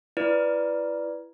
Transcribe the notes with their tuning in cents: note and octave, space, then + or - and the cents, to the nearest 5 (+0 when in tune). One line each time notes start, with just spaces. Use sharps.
E4 +25 B4 +0 D5 +0